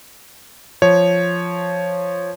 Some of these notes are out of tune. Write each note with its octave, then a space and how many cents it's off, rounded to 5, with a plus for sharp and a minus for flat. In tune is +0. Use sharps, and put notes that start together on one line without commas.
F3 -5 C#5 +0